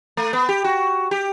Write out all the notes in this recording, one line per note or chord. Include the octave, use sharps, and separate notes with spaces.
A3
B3
G4
F#4
G4